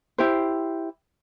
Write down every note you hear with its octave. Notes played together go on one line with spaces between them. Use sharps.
E4 G4 C5